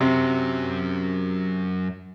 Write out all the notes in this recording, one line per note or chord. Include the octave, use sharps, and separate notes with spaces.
F#2 C3 F#3